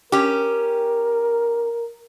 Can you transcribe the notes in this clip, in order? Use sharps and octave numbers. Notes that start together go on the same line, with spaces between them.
C#4 G4 A#4